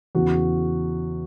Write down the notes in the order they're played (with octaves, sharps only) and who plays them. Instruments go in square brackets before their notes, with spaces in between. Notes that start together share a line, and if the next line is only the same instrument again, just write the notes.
[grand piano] E2 C#3 E3 F#4